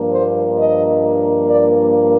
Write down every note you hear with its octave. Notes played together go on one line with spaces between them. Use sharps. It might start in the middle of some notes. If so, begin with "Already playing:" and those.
Already playing: G2 F3 A#3 D4
C5
D#5
D5